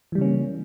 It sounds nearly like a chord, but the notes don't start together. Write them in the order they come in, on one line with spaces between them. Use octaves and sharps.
E3 G3 C#3 C#4 A#3